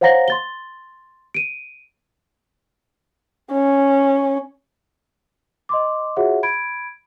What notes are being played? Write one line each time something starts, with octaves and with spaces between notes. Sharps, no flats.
C5 C#5 F5 F#5 A#5 A#6
C6 A6 G7
D7 D#7
C#4
D#5 C6 D6
F4 F#4 G#4 C#5 E5 F#5
B5 G#6 D7